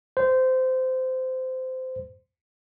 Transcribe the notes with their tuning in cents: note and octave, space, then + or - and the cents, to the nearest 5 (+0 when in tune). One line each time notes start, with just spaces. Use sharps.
C5 -20